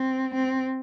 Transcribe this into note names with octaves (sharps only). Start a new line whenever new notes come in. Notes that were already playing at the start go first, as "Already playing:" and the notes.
Already playing: C4
C4